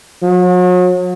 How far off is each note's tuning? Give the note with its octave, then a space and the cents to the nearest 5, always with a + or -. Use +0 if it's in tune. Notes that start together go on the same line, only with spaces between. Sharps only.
F#3 -40